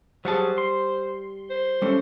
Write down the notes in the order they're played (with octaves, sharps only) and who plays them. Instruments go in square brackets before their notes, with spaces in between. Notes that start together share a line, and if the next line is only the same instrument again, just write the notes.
[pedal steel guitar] F#3 G#4 [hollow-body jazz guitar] G3 F#5 A5 [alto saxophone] C5
[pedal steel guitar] C6
[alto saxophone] C5
[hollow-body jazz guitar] G3 C#4 A4